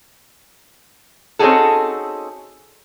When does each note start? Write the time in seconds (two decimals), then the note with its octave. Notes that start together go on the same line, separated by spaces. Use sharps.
1.39 C4 C#4 D#4 F#4 G#4 A4